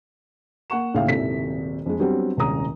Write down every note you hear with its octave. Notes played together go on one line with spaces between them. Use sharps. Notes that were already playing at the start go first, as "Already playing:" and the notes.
A#3 F#5 C#6 E7
D#2 A2 C#3 E4 F5 G5
D#1 G#1 C3 E4 A4 B6
F2 G#3
F#3 G3 B3 C4 D4 G4
D#1 C2 G#3 C#4 A#5 D#6